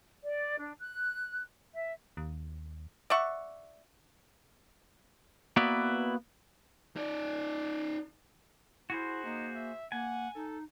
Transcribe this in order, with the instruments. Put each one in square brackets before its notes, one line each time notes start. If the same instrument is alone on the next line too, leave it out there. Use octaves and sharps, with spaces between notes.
[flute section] D5
D4
F#6
E5
[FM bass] D#2
[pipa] D5 E5 F#5 C#6
[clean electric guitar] A#3 B3 E4 F#4 B4 D5
[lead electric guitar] D#4 D5
[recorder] E4 [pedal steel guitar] F#4 G#4 C5
[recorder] A#3 [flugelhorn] D#4
[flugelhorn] E5
[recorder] A#3 [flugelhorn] F#5 [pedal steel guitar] G#5
[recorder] D#4 [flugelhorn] A4